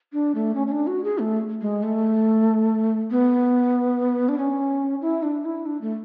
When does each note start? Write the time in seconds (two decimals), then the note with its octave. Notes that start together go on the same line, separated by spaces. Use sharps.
0.13 D4
0.35 A3
0.55 C#4
0.67 C#4
0.71 D4
0.87 F#4
1.04 G#4
1.19 A3
1.61 G#3
1.83 A3
3.11 B3
4.29 D4
4.38 C#4
5.01 E4
5.23 D4
5.45 E4
5.66 D4
5.81 A3